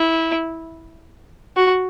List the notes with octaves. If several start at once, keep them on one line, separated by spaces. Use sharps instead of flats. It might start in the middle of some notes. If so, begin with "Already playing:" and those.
Already playing: E4
F#4